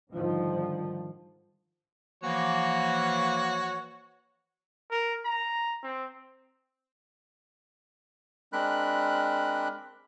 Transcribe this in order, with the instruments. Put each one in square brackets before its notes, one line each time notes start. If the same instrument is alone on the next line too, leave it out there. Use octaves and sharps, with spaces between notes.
[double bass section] G#2 D3 D#3 F3 G3
[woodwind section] E3 F3 A#3 [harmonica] F#4 C#5
[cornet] A#4
A#5
C4
[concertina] G#3 C4 D4 A#4 B5 F#6